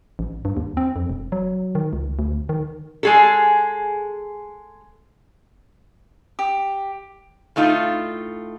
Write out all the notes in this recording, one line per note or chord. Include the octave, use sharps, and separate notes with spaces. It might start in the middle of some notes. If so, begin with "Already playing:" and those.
A1
G2
D#2
C4
F2
E1
F#3
D#3
C#2
D2
D#3
G#3 G#4 A4
G4
A2 A3 D#4 F4